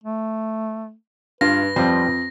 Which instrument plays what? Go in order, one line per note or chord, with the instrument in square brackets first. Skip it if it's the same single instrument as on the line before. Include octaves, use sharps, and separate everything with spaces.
[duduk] A3
[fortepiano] G2 [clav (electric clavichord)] F4 [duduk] B4 [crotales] A#6
[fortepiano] F2 [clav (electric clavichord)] F3 G3 C5